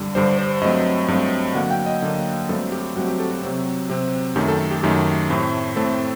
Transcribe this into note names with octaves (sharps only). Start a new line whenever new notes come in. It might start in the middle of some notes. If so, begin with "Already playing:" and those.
Already playing: G2 D3 G3
G2 D3 G3 C5
C5
G2 F#3 A3 C4 D#5
G2 F#3 A3 C4
D3 F#3 A#3 F#5
F#5
G5
D#5
D3 F#3 A#3
G2 F#3 A3 C4 A4
G4
G2 F#3 A3 C4 F#4
G4
A4
F#4
C3 F#3 C4
C3 F#3 C4
F#2 D#3 A3 G4
A4
G4
F#2 D#3 A3 G4
A2 A3 C4
A2 A3 C4 A4